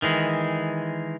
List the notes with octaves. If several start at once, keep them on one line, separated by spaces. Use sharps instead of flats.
D#3 E3 G#3